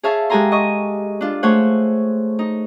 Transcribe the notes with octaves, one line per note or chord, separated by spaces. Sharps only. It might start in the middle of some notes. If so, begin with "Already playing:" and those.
G#4 C#5 E5 F5 A5
G#3 G4 A4 G#5 A#5 C6
D#5 C#6
D4 F4
A3 G#4 C5 C#5 F#5
D#4